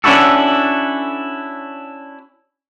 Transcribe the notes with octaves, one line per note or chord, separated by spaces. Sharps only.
C#4 D4 E4 F#4 A4